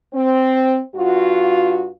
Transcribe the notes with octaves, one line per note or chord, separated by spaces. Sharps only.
C4
G2 F4 F#4